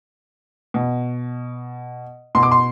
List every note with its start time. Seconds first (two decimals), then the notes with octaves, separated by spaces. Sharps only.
0.74 B2
2.35 B2 C6
2.43 D6
2.51 C6